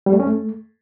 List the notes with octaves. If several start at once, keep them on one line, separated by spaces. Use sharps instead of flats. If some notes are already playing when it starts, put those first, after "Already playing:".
G3
A3
C#4
A3